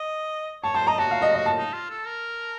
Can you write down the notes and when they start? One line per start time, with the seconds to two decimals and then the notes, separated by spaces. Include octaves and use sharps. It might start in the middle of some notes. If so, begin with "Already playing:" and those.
Already playing: D#5
0.63 C#5 A5
0.74 C5 A5
0.87 D#5 A#5
0.98 F#4 A5
1.11 F5
1.22 D#5
1.34 D#5
1.46 A5
1.57 D#4
1.73 F4
1.90 A4
2.05 A#4